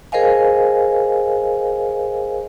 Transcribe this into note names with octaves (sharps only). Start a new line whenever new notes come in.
G#4 A#4 C5 D#5 F5 G#5